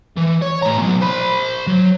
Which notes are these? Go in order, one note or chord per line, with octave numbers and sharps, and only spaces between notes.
E3
C#5
A2 A#5
B2 F#3
C5 B5
F#3